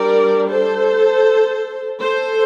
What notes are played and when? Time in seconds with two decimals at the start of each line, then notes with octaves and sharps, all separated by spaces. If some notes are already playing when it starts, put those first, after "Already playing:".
Already playing: G3 D4 A#4 D5
0.48 A4 C5
2.01 A4 C5